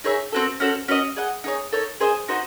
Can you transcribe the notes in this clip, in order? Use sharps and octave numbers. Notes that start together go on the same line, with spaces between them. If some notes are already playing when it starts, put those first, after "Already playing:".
D#4 G#4 C#5 E5
C4 F#4 A4
C#4 F#4 A4 C5
C#4 F#4 C5 D#5
G#4 D#5 F#5
D#4 G#4 C#5
D#4 A4 C#5
G#4 C5 D#5 G#5
D#4 F#4 C5 D#5